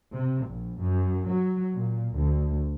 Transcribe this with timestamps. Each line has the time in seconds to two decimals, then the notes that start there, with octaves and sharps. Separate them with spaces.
0.13 C3
0.48 A#1
0.82 F#2
1.29 F#3
1.75 A#2
2.16 D2